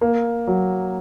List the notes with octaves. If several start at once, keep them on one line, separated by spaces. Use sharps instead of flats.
A#3
F#3